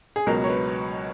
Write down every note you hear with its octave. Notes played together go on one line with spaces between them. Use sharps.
G#4
C#2 B2 F#3 A#4
C#5
B4